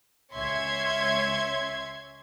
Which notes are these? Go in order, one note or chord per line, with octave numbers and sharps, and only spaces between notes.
C#2 C#4 C#5 E5 C6 G#6